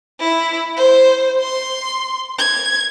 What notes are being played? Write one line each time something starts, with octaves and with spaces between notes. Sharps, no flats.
E4
C5
C6
G#6